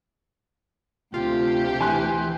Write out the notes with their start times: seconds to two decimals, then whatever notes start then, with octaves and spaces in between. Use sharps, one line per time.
1.14 D2 C3 F4 G4
1.81 E3 G#5 C6 F#6